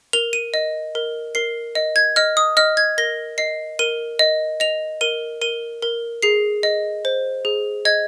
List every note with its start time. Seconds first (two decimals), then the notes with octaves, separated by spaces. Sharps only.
0.13 A#4 F7
0.33 D#7
0.54 D#5
0.95 A#4
1.35 A#4 C7
1.75 D#5
1.96 G#6
2.16 D#5 F6
2.37 D#6
2.57 D#5 F6
2.77 G#6
2.98 A#4 A#6
3.38 D#5 C7
3.79 A#4 D#7
4.19 D#5
4.60 D#5 F7
5.01 A#4 D#7
5.41 A#4 D#7
5.82 A#4
6.22 G#4 C7
6.63 D#5
7.05 C5
7.45 G#4
7.85 D#5 G#6